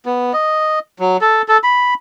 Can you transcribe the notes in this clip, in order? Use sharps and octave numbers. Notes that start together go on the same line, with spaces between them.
B3
D#5
F#3
A4
A4
B5